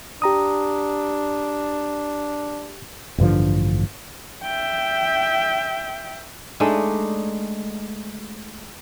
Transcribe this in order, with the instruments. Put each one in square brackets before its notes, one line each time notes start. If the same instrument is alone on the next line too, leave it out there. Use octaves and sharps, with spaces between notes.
[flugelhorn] D4 [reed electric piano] G4 A#5 D#6
[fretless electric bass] A1 G2 D3 F3
[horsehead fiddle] E5 G5
[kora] G#3 A3 D4 D#4